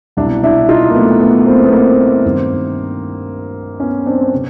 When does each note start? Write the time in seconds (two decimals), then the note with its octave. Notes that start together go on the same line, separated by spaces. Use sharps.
0.17 C2 D4 E4
0.21 B2
0.43 D4 E4
0.69 D#4 F4
0.90 A#3
0.94 A3 B3
1.20 A3 B3
1.46 A#3 C4
1.64 B3
1.73 A#3 C4
2.25 G2 D#3
3.80 B3 C#4
4.06 C4 D4
4.34 C3